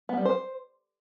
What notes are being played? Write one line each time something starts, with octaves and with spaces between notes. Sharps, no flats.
B3
G3
C5